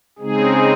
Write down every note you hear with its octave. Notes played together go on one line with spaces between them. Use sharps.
C#3 G#3 C4 D#4 G#4